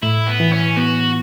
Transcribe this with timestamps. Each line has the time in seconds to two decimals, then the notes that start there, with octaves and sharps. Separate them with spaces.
0.02 A2 E4
0.27 B3
0.40 E3
0.53 C#4
0.77 B3 F#4